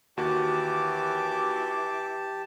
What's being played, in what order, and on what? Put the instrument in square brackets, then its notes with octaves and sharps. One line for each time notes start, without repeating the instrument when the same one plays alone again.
[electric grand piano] D#2 F#4 [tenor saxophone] E3 [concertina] G4 A5 [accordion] D6